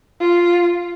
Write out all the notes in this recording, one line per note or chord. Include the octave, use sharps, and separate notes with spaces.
F4